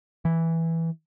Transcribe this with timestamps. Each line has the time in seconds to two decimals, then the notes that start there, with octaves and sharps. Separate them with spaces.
0.25 E3